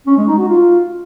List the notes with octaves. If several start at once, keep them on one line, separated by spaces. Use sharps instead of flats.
C#4
G#3
D#4
F#4
F4